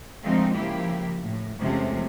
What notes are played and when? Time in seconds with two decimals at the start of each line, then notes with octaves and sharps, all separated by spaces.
0.24 D3 F3 G#3 A3 C4 D#4
0.55 C#3 F3 A#3 E4 G4
1.24 A2
1.59 E2 C3 F3 G#3 A3 C#4